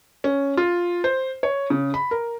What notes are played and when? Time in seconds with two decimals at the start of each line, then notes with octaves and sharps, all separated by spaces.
0.24 C#4
0.57 F4
1.04 C5
1.43 C#5
1.70 C#3
1.94 B5
2.11 A#4